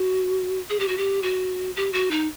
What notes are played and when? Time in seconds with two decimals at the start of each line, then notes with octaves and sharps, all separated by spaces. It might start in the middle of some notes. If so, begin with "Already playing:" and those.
Already playing: F#4
0.70 G#4
0.80 G4
0.88 F#4
0.97 G4
1.23 F#4
1.76 G4
1.93 F#4
2.11 D#4